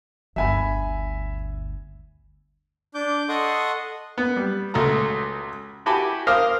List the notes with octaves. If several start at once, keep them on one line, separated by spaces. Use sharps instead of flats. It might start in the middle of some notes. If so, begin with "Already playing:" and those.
G1 D2 E5 G#5 B5
D4 D6 G6
A4 D#5 F#5 C6 C#6 D#6
B3
G3
C#2 A3 F#4 A#5
E4 F#4 G4 G#5 A5 B5
A#4 C5 F5 D6 D#6 F6